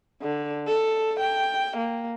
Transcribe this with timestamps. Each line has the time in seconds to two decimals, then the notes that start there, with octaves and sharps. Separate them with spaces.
0.21 D3
0.68 A4
1.20 G5
1.78 A#3